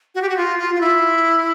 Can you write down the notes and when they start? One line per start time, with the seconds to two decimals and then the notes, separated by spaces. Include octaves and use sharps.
0.15 F#4
0.22 G4
0.29 F#4
0.37 F4
0.59 F4
0.75 F4
0.81 E4